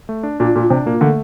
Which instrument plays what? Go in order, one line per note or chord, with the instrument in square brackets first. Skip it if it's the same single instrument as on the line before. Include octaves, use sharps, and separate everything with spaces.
[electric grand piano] A3
D4
[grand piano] A#2 [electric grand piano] D4
[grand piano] A#2 [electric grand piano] D4
[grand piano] C3 [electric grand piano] D4
[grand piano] A#2 [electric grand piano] A#3
[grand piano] D3 [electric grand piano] A3